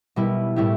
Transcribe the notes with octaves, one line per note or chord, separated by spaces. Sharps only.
B2 G3 B3 E4
A2 G3 E4 G4